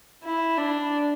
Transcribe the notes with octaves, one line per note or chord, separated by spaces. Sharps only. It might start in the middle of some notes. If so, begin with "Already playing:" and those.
E4
D4